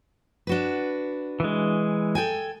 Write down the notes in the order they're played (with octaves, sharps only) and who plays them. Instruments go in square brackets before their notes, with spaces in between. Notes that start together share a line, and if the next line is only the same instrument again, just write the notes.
[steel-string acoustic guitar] D4 F#4 B4
[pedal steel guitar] E3 G#3
[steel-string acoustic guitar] A4 G5 G#5